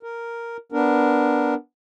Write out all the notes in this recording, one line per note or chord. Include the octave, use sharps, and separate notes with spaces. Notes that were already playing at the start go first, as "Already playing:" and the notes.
A#4
B3 D4 A#4